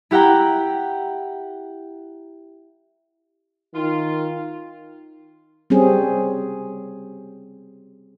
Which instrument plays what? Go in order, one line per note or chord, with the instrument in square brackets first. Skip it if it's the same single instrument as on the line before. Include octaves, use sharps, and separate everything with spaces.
[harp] E4 G4 F#5 G5 A#5
[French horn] D#3 [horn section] F4
[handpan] G3 C4 C#4 G#4